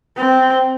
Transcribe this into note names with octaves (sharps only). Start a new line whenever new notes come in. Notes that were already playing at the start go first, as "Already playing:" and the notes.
C4